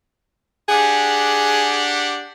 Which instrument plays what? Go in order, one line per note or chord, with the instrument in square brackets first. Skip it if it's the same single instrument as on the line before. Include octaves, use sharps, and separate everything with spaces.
[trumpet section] D4 G4 F#5 [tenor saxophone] G#4